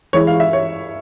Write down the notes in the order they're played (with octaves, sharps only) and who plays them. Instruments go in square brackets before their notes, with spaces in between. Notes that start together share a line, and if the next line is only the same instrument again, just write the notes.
[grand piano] E3 G#3 E4 [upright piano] C#5
[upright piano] F5
E5
C#5